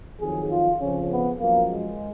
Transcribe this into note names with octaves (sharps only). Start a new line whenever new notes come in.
F2 D#3 F#3 G#4
F4
F2 C#3 F3 C#4
B3
F#2 F3 A#3
G#3